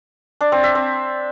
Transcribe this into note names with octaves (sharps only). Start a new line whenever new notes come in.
D4
C4
E5
C4